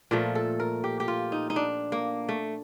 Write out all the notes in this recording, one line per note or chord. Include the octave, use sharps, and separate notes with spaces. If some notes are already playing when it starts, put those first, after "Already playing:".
A#2 F3 A3 A#4
A4
A#4
G4
G4
F4
D#4
D#4
D4
A#3
A3